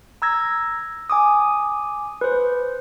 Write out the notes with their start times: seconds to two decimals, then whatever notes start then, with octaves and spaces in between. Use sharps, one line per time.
0.22 A#5 E6 G#6 A#6
1.10 G#5 D6 D#6
2.21 B4 C5